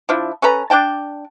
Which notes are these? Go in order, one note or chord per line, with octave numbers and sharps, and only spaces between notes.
F3 D4 E4
C#4 A4 B4 A#5
D4 D5 G5 A5